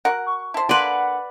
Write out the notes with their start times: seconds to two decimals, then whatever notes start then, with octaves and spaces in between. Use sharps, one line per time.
0.05 F#4 A#4 F#5
0.26 C#6
0.54 E4 C5 A5
0.69 D3 A#3 B4 D5 F#5 C6